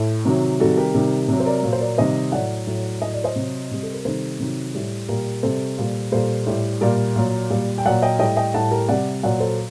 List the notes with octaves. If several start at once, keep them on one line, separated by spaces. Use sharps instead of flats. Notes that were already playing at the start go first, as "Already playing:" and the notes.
Already playing: A2
C3 D#3 F#3 F#4
C3 D#3 G3 F#4 A4
G4 A#4
C3 D#3 G3
C3 F#3
C5
A#4 D5
A#2 F#3
C5
A#4 D5
C3 D#3 G3 C5 D#5
A2 F#3 D5 F#5
A2 F#3
A2 F#3 D#5
D5
C5 D#5
C3 F#3
C3 G3
A4
A#4
C3 D#3 G3 A4 C5
C3 D#3 F#3
A2 G3
A#2 G3 G4 A#4
C3 G3 A4 C5
A#2 G3
A#2 G3 A4 C5
A2 G3
A#2 G3 A#4 D5
A#2 F#3
A#2 G3
G5
A#2 F#3 D5 F#5
D#5 G5
A2 G3 D#5 G5
D#5 G5
A2 G3 F#5 A5
G4 A#4
C3 G3 D5 F#5
A#2 F#3 D5 F#5
A4 C5